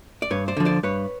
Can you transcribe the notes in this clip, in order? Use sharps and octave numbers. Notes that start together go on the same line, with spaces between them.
D5
G2 B4 C#5
C5 D5
D3 F3
C5 D5
G2 B4 C#5